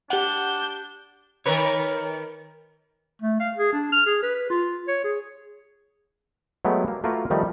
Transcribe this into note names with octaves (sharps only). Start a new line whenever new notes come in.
D4 G4 F#5 G6
D#3 A#4 B4 C#5
A3
F5
G#4
D4
F6
G#4
B4
F4
C#5
G#4
F#3 G#3 A3 B3 G4
A#3
A3 A#3 F4 F#4 A#4 B4
D#3 F3 G3 A3 D#4